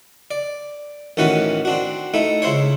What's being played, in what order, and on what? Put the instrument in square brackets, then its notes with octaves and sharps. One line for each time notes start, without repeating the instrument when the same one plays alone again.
[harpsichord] D5
A1 D#3 E3 C#4 F#4 B4
C4 D4 F#4
A3 D#4 E4
C#2 E4 C5 C#5